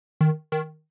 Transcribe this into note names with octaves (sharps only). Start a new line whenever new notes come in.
D#3
D#3